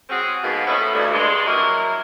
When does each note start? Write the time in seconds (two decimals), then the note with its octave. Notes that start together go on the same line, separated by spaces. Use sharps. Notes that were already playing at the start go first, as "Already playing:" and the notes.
0.10 G#3 C4 C#4 F#4 G#4
0.44 G#2 B2 A#3 B3
0.67 A3 B3 C#4 D#4 E4
0.94 D2 G2
1.13 G2 G#3
1.47 F#3 A#3 E4 A#4